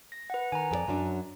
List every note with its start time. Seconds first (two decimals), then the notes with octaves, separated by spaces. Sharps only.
0.12 A#6
0.30 B4 F#5
0.52 D#3 G#5 A#5
0.71 F2 A4 D5
0.87 F#2 F#3 D4